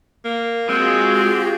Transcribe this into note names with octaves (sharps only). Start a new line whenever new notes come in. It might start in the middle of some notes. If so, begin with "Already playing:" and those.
A#3
G#3 C4 F4 F#4 G#4
G4